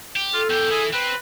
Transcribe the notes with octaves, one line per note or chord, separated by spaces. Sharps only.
G4
F4 A4
E2 G4 G5
E3 G#4
C4 B4